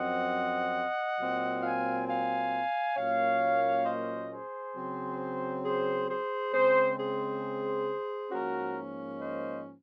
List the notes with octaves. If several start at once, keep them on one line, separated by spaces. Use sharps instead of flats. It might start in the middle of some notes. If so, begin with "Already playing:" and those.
Already playing: F#2 F3 C4 D#5 F#5
A#2 F#3 C4
F5 G#5
F5 G#5
A#2 F#3 A#3 C#4 C#5 F5
C5 D#5
G#4 C5
C#3 F#3 C4
G#4 C5
G#4 C5
C#3 G#3 C4 G#4 C5
G#4 C5
G#2 F3 A#3 C#4 F#4 A#4
C5 D#5